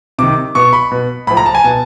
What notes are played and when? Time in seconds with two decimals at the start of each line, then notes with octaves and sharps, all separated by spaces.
0.18 C3 D#3 D6
0.55 B2 C#6
0.73 B5
0.92 B2
1.27 A2 F3 B5
1.37 A#5
1.46 A5
1.55 G#5
1.64 B2 A5